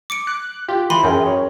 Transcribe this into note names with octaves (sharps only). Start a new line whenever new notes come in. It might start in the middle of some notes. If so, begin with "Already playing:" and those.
D6 C#7 D7
F#6
F4 G4
E3 B5 C6 D#7
F#2 G#4 A#4 G5
C#5